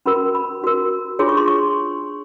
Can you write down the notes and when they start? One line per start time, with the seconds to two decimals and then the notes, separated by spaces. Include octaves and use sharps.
0.06 C#4 F#4 A#4 B5
0.35 B5
0.62 C#4 F#4 A#4
1.19 D4 F4 G#4 C#5 C6
1.29 C#6
1.37 C6
1.48 C#6